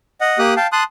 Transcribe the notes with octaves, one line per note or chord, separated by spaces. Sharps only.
D#5 F#5
A#3 G4 D#6 F#6
F5 G5 A5
A5 C6 D#6 F#6